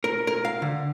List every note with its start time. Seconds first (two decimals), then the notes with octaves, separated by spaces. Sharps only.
0.04 A#4
0.27 A#4
0.45 F5
0.62 D3